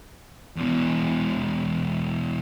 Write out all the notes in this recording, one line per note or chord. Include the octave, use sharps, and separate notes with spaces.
E2 B2